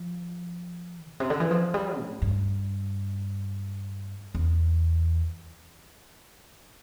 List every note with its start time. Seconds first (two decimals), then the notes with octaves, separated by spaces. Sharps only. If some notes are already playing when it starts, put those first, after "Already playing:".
Already playing: F3
1.10 A#2
1.20 C3
1.30 D3
1.40 E3
1.51 F3
1.74 G3
1.98 A2
2.22 G2
4.35 E2